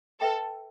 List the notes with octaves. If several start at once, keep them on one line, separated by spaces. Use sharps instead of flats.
A4 B4 E5 G5